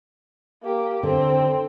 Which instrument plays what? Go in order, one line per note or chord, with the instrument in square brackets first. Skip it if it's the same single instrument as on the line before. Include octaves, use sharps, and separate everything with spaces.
[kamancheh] A#3 G4
[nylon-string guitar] D3 [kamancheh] C4